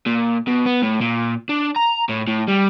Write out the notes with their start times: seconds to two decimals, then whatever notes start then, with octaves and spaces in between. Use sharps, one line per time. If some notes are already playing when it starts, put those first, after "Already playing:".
0.07 A#2
0.48 B2
0.66 B3
0.82 A2
1.01 A#2
1.49 D4
1.76 A#5
2.09 A2
2.27 A2
2.48 G3